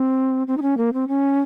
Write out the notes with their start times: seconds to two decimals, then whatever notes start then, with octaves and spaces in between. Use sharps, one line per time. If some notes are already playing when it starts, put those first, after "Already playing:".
Already playing: C4
0.47 C4
0.57 D#4
0.62 C#4
0.77 A#3
0.93 C4
1.08 C#4